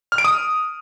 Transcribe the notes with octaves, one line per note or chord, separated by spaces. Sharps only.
F6
D7
D#6